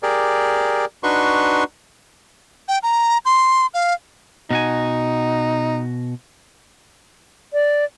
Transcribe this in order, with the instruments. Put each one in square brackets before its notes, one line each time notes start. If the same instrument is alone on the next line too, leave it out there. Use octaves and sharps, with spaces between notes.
[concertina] G4 G#4 A#4 D5
D4 D#4 F#4 B4 C6 C#6
[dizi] G5
A#5
C6
F5
[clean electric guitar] B2 F#4 G#5 [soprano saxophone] D#4
[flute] D5